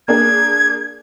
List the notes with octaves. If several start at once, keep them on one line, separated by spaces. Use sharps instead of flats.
A#3 D4 G#4 G#6